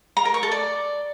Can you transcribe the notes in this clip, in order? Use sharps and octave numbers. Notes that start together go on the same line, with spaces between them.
A#5
A#4
C#6
A4
D5